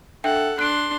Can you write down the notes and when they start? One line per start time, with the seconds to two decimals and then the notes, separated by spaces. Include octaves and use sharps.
0.24 D4 A4 E5 F#5 G5
0.59 D4 C6 F#6 D7